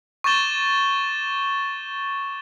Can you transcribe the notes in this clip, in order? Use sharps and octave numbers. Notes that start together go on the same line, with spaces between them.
C#6 D6 G6 A6 E7 G7